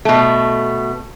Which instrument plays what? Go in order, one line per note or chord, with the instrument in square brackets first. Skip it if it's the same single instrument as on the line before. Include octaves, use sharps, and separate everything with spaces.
[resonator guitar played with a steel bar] B2 A3